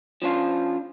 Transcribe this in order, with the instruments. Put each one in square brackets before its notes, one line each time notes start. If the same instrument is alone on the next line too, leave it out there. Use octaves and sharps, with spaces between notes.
[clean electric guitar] F3 C#4 D4 F4